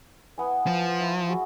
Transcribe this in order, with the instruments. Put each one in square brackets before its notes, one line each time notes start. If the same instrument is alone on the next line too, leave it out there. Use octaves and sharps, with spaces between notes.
[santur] B3 E4 G#5
[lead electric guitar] F3
[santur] E4
F#4 G#4